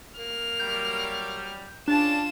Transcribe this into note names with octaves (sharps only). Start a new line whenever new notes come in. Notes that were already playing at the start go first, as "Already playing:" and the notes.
A#3 F6
F#3 G3 G6
C#3 D4 F4 D5 A5 E7